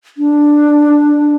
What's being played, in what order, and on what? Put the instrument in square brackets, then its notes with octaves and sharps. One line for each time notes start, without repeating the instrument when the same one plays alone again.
[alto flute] D4